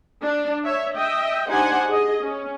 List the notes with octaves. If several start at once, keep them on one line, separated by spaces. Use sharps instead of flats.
D4
C#5 E5
D#5 E5 G5
D4 D#4 G4 C5 F#5 G#5
G#4 D#5
C#4